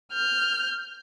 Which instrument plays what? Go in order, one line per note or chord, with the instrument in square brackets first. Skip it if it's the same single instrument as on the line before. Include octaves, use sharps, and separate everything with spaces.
[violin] F6 G6